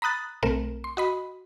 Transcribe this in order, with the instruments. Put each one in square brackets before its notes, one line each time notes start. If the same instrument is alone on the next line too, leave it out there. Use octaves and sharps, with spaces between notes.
[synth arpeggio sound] A#5 B5 D#6 F#6 A6
B1 A3 C4 A#4 E7
C6
F#4 D#5 B5